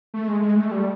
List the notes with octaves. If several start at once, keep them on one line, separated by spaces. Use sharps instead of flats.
A3
G#3
G#3
A3
G3